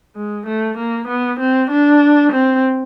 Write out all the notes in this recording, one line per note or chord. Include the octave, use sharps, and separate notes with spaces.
G#3
A3
A#3
B3
C4
D4
C4